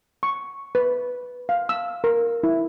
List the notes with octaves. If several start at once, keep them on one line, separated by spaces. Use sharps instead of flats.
C#6
B4
F5
E6
A#4
E4